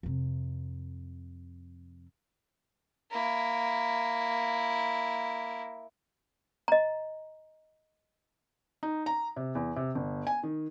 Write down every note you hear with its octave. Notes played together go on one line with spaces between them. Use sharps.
F2 C3
A#3 E4
D#5 A#5
D#4
A#5
C3
E2
C3
G1
G#5
D#3